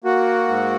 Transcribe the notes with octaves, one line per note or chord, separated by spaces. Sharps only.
A#3 F#4
G#2